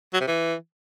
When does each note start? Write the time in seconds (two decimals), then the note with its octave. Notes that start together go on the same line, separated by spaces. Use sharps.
0.14 F#3
0.21 C3
0.28 E3